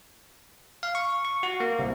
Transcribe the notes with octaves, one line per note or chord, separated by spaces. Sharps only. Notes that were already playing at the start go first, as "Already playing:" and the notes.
F5
C#6
C#6
F#4
A#3
C2